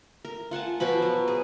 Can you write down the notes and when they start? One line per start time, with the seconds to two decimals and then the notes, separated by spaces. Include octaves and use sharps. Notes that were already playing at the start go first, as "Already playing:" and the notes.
0.25 A#4
0.51 F4 F#5 G#5 A5
0.80 B2 F3 F#4 B5
1.02 F#3
1.28 G#4